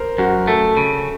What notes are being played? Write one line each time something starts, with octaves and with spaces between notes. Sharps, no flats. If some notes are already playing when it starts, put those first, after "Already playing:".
Already playing: A#4 C5
F#2 F#4
A3 A4
C#3